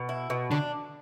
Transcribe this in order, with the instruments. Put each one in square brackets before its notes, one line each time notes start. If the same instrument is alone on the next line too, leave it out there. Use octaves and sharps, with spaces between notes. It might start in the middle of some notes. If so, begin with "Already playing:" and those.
Already playing: [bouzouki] B2
E4
B2
[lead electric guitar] D3 [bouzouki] D4